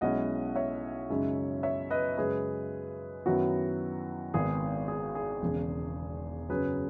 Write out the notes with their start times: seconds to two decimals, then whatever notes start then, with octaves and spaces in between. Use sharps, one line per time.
0.01 B1 B2 G#3 C#4 E4 D#5 F#5
0.56 C#5 E5
1.10 F#2 C#3 G#3 D#4
1.63 C#5 E5
1.90 B4 D#5
2.17 F#2 C#3 G#3 C#4 G#4 B4
3.26 F#2 D#3 F#3 B3 E4 F#4
4.34 G#1 G#2 D#3 G#3 B3 G#4
4.88 G#4
5.15 G#4
5.42 E1 E2 C#3
6.49 F#2 C#3 F#3 G#4 B4